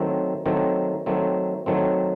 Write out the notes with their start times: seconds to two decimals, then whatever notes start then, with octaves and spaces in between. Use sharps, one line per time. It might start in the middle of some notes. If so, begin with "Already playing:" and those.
Already playing: D#3 F#3 A3 C4
0.46 D#3 F#3 A3 C4
1.06 D#3 F#3 A3 C4
1.66 D#3 F#3 A3 C4